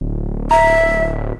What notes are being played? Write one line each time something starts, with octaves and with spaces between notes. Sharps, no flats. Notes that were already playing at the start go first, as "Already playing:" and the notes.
D1
E5 A#5